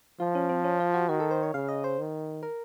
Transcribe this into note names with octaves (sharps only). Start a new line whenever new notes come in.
F3 F4
C#4
C4
C#4
F4
F#4
D#3 F#4
A4
C5
C#5
C#3 F5
D#5
C5
D#3
A#4